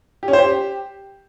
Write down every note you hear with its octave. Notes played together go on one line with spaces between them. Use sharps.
G4
C#4
C5
G4